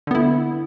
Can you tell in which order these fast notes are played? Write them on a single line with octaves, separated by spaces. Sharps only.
D3 B3 E4